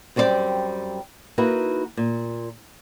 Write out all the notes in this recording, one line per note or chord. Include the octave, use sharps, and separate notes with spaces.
F#2 G3 C4 E4 D5 G5
A#3 D#4 E4 F#4 A#4 B4
A#2